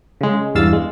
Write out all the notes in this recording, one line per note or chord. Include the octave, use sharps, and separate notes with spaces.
C#3 G#3
E2 G2 F5 E6 A6
G#3